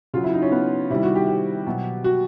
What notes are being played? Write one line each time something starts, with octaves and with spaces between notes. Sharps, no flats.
C#3 F#3 F4
E4
D#4
C#4
B3
C3 D#3 G3 E4
F#4
G4
G4
B2 F#3
F#4